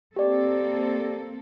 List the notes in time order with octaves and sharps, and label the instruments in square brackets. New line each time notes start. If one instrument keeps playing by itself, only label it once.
[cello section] A#3 C4 A4 [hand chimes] G4 D5